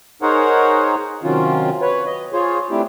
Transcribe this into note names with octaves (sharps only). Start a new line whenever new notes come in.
D#4 G#4 A#4 C5 C#5 F#5
C3 D#3 F#3 C#4 F4
B4 C#5
D#5
F4 G#4 C5 C#5
A3 C4 D4 E4 G4